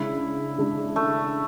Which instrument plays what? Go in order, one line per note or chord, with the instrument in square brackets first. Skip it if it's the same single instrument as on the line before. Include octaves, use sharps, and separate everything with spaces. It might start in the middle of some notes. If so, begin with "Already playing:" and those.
Already playing: [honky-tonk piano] C#3 G#3 D4 [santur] E4
[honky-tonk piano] C#3 G#3 D4
[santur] A3